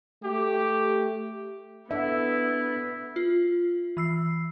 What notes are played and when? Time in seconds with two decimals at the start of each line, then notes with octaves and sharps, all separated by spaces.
0.23 A3 G4
1.91 B3 D4 E4 A4 E5 F#5
3.16 F4
3.97 E3 E6 C7